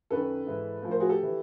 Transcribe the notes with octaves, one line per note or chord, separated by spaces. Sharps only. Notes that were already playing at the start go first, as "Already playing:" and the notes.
F#2 D#3 A4 B4
G#2 E3
A2 F3
A#4 C5
F#4 G#4
G4 A4
E3